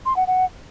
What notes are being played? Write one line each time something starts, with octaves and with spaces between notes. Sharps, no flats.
C6
F#5
F#5